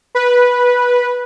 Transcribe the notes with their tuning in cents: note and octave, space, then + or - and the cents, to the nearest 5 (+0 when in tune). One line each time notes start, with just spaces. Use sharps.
B4 -10